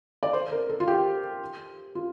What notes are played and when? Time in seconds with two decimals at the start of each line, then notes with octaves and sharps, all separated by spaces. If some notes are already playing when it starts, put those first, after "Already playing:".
0.23 D5
0.33 C5
0.52 A#4
0.69 A4
0.80 F4
0.88 G4
1.95 F4